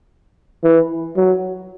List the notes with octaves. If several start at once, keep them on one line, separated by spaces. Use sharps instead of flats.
E3
F#3